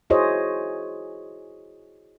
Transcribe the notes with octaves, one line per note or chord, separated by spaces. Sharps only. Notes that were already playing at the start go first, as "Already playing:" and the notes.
E4 F#4 G#4 C5 C#5 D#5